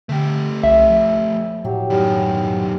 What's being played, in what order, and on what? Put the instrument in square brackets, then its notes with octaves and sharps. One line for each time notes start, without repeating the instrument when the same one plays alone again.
[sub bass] D3 [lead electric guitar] A3 G4
[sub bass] B1 [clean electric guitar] E5
[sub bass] F3
[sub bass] A2 [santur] F#3 G4
[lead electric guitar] F#2 D#3 [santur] G3